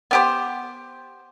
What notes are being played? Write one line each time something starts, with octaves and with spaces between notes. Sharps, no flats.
B3 G4 C5